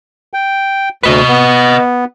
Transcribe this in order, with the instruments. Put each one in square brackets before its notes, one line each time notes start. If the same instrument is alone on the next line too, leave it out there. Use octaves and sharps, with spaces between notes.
[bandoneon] G5
[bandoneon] D2 [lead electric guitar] B4 D#5
[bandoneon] B3